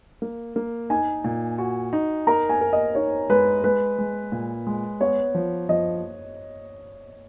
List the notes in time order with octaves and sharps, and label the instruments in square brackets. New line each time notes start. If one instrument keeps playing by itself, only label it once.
[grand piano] A#3
A#3
[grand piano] D#4 [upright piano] G#5
[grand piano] A#2
F#4
D#4
[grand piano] A#4 [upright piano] A#5
[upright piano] G#5
[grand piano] A#4
[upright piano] D#5
[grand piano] D#4 [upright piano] C#5
[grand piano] G#3 [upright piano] B4
[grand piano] G#3 [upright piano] B4
[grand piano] G#3
A#2
G#3
[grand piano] B3 [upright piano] C#5
[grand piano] F3
[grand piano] F3 [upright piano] D#5